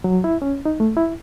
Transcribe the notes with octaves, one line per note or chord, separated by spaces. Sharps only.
F#3
E4
C#4
D#4
A3
E4